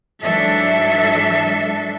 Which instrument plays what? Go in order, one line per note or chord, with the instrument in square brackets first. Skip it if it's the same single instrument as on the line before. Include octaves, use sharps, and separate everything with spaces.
[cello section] G#2 E3 F#3 D4 A4 E5